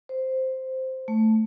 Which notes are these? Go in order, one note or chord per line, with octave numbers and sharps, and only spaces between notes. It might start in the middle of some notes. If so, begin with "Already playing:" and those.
C5
A3